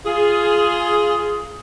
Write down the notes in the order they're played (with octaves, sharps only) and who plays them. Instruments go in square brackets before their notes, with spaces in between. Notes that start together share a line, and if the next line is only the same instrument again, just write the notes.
[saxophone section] F4 G#4